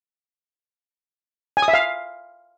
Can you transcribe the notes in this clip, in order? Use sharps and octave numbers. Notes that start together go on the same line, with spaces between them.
G#5
D#6
E5
F5